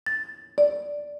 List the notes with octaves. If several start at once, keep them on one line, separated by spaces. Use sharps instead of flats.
A6
D5